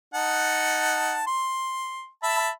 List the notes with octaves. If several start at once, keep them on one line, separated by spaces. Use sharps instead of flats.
D#4 F#5 A5
C6
E5 A5 B5